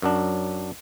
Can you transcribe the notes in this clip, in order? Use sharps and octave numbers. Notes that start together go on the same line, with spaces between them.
F#2 F#3 D4